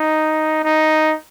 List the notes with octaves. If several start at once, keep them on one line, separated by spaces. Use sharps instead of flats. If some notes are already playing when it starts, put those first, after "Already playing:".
Already playing: D#4
D#4